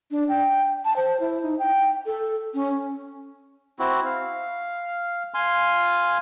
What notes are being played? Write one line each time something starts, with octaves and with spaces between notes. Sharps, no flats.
D4
G5
A5
C5
E4
D#4
G5
A4
C#4
C4 E4 F#4
F5
F5 G#5 C6